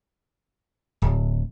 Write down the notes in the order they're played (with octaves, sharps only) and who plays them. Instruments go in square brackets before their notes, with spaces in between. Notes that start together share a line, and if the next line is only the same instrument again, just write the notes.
[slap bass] D1